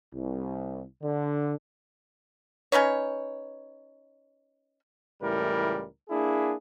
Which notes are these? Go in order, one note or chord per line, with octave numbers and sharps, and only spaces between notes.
C2
D3
C#4 D#4 B4 C#5
C#2 A2 E3 G3 A#4
A#3 D4 E4 G#4